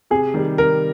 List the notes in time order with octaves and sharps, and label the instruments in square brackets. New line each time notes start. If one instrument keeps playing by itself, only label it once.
[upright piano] C3 [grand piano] G#4
[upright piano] D#3 G3
[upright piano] C3 [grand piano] A#4